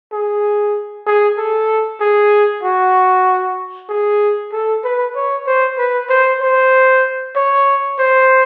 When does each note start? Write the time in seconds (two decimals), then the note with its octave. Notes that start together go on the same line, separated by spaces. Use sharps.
0.12 G#4
1.06 G#4
1.38 A4
2.00 G#4
2.63 F#4
3.89 G#4
4.52 A4
4.84 B4
5.15 C#5
5.47 C5
5.78 B4
6.09 C5
6.41 C5
7.36 C#5
7.98 C5